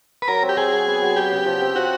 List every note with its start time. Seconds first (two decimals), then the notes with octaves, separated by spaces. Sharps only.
0.22 B4
0.28 F#3 A#4
0.42 C4
0.49 G4
0.57 C4 G#4
0.73 F#3
0.87 B3
1.02 F#3
1.16 F#3 G4
1.32 C#3
1.46 F3
1.61 C4
1.75 F3 F#4